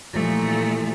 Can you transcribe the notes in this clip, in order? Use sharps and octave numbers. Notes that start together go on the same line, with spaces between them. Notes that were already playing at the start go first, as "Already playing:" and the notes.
A#2 E3 F3 G3 A3